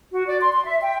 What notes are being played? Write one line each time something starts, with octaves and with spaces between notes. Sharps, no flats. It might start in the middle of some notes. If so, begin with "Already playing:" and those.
F#4
D5
C6
C6
E5
G5